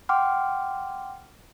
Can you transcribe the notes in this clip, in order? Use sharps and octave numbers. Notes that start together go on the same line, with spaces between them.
F#5 G5 C6 D6 F6